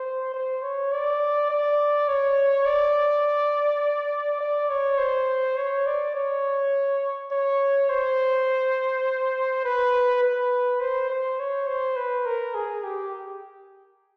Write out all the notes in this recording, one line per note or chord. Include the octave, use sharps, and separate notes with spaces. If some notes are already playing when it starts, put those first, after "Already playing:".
Already playing: C5
C5
C#5
D5
D5
C#5
D5
D5
C#5
C5
C#5
D5
C#5
C#5
C5
B4
B4
C5
C5
C#5
C5
B4
A#4
G#4
G4